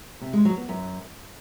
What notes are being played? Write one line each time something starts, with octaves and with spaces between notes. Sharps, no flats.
C3
G#3
F#3
B3
F#2